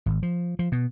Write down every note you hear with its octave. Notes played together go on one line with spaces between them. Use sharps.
G#1
F3
F3
B2